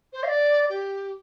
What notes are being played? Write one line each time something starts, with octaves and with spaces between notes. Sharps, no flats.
C5
F5
D5
G4